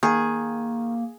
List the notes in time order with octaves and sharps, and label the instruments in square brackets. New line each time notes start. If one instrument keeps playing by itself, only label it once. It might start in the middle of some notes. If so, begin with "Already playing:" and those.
[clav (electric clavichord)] D#3 [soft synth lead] A#3 [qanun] G#4